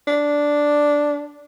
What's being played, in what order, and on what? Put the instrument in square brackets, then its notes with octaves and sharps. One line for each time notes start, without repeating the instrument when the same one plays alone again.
[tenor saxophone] D4